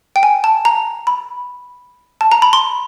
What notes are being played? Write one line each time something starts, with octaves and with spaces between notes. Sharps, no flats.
G5
G#5
A5
A#5
B5
A5
A#5
B5
C6